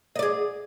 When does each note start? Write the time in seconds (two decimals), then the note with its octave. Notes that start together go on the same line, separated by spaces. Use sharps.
0.15 D#5
0.19 D5
0.23 G#4